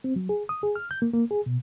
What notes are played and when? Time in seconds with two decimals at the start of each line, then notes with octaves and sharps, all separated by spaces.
0.04 C4
0.16 F#3
0.29 G#4
0.49 D#6
0.63 G#4
0.76 F6
0.91 G6
1.02 A#3
1.13 A#3
1.31 G#4
1.46 B2